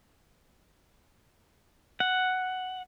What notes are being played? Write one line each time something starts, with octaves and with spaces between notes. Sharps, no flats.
F#5